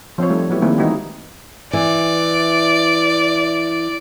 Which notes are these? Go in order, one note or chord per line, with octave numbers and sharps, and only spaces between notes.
F3 C4 C5 C#5
G3 A3 D#4
F#3 B3 E4 G4
D#3 G3 A3 A#3 C4 E4
E3 G#3 D#4 E4 F#4 G4
E3 D5